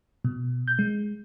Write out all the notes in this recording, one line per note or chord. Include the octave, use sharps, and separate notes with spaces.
B2
G6
G#3